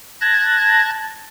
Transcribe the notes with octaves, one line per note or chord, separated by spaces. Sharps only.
A5 F#6 G#6 A#6